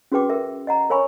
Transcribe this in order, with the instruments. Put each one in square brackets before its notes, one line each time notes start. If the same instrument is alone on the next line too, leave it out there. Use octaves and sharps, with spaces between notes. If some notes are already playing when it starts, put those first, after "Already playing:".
[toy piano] C#4 F#4 G#4 B4 G5 D6
A#4 E5
D#5 F#5 A#5
A#4 C#5 F5 G#5 B5 C#6